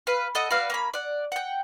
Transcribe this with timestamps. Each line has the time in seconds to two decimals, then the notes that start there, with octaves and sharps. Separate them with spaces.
0.07 B4 F5
0.35 A4 D#5 F#5
0.51 F#4 B4 D5 F5
0.70 A#3 C#4 B5
0.94 D5 F#5
1.32 F#5 G5